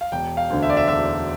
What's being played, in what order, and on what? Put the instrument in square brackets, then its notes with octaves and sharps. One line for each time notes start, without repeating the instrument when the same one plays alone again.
[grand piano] F5
E1 G5
F5
D2 D3
E5
D5
E5
E1 E5